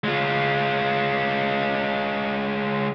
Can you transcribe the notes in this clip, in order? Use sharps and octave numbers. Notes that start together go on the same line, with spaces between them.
G#3 F4